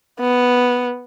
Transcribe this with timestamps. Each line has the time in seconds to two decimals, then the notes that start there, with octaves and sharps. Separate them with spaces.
0.20 B3